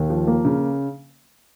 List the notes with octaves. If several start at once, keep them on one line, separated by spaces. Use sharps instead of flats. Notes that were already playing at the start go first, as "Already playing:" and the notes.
Already playing: D#2
F3
A#3
C#3